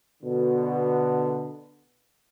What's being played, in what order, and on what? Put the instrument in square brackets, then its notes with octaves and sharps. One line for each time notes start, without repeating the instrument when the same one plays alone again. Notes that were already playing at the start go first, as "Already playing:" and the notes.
[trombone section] B2 D3